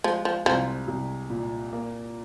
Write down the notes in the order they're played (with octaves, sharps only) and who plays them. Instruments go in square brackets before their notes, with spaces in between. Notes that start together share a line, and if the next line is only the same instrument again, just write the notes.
[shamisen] F3 [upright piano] G#3
[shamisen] F3
[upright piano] C2 [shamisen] F3
[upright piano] C2
A#2
A#3